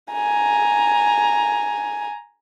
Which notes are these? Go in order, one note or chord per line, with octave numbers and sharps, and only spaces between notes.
G#5 A#5